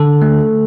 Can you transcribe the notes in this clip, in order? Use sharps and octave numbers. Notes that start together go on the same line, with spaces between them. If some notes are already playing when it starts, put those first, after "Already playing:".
Already playing: D3 A4
A3